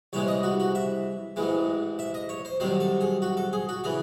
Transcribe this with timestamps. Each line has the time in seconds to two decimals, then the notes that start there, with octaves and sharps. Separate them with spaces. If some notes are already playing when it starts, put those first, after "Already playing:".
0.13 C2 C3 E3 G#3 C#5
0.28 D#5
0.43 F#4
0.60 F#4
0.75 E5
1.36 A1 G#2 E3 G#3
1.99 E5
2.14 D#5
2.29 C#5
2.45 C5
2.60 C2 C3 D#3 F#3 C5
2.80 A4
3.01 G#4
3.22 F#4
3.37 A4
3.53 G#4
3.69 F#4
3.84 C#3 E3 G#4